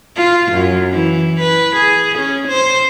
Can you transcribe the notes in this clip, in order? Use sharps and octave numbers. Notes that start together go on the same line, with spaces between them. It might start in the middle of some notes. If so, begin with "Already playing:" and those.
F4
F#2
E3
B4
G#4
C#4
C5